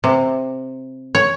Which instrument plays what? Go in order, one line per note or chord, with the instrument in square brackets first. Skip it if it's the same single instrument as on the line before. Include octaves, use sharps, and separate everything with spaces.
[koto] C3
C#5